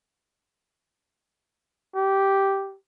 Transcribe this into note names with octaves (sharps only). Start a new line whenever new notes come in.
G4